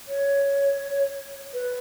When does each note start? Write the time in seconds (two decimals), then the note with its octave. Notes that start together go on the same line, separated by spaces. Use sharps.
0.08 C#5
1.53 B4